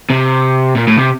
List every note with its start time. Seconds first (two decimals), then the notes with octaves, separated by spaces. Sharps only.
0.10 C3
0.76 A#2
0.88 A2
0.98 C3